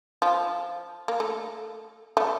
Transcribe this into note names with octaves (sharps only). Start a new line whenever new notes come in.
F3
A#3
A3
A3